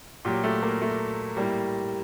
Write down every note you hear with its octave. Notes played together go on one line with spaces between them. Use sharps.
A#2 F#3 G4
A3
A#3
A3
A2 G3 A#3